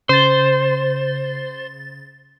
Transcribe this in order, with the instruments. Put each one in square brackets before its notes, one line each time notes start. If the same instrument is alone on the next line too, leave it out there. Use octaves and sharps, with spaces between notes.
[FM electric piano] C#3 A6 [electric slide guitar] C5